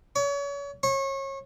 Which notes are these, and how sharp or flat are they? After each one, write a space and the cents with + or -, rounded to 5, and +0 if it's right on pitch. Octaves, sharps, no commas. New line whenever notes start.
C#5 +35
C#5 -30